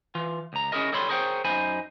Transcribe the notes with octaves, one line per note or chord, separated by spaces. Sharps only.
E3 F4
C#2 A#5
C#4 D4 E4 G#4 A#4 D#5
G3 A4 C#5 B5 C6
G#4 A#4 C5 C#5 G5
F#2 D#4 C5 G#5 B5